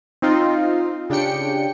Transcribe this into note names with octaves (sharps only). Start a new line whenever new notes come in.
C4 D#4 F4
C#3 D4 G4 G5 C#7